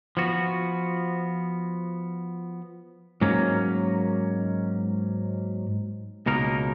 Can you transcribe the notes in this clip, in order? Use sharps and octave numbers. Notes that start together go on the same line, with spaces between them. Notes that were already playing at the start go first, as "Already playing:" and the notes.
F3 B3 F#4
G#2 F#3 A#3 C#4
C#2 B2 A#3 D#4 A#4